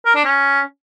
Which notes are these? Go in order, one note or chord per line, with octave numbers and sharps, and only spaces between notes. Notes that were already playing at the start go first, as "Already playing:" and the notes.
A#4
D4
C#4